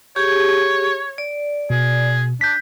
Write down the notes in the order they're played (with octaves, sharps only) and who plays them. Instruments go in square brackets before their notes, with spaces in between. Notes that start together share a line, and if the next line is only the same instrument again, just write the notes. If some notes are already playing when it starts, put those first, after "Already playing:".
[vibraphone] G4 G#4 [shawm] C#5
[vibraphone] D5
[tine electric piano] B2 [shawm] G#4
[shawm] D4 [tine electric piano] G6 B6